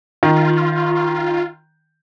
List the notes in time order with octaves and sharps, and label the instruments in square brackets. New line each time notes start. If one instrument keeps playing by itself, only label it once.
[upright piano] D#3 [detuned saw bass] F4